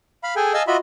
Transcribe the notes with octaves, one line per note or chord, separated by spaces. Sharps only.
F5 B5
G#4 A4 G5 G#5
D#5 F5 G#5 A5 E6
F4 F#4 D#5 E5 B5